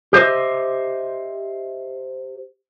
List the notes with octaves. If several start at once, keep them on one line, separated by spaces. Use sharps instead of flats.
G4 C5 D#5 E5